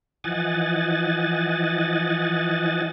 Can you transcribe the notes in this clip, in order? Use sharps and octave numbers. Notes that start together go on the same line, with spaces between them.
E3 F3 D#5 F#5 G#5 A6